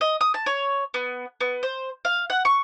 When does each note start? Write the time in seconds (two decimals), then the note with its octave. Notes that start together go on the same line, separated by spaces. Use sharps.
0.01 D#5
0.21 D#6
0.34 A5
0.46 C#5
0.94 B3
1.41 B3
1.63 C5
2.05 F5
2.30 F#5
2.45 C#6